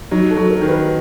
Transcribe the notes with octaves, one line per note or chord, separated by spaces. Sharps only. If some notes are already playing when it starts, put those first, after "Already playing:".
F#3 D#4
A4
F#3
A#4
D#3
B4